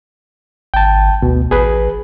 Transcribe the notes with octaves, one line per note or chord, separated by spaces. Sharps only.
G#1 G5 A5
D2 B2
A1 G#4 B4